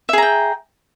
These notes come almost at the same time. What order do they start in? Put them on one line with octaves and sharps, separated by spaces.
E5 G#4 A#5 G5